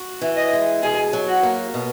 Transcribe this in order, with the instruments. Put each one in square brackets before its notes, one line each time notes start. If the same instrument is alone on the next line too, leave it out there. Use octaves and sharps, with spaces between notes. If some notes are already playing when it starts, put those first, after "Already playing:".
Already playing: [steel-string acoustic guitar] F#4
E3
[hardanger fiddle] D#5
[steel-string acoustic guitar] G#3
[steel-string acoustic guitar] B2 [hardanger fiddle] G#4
[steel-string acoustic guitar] F#3
[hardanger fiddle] F#4
[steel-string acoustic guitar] A#3
B2